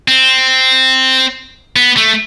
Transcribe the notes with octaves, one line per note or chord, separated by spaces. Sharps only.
C4
B3
A3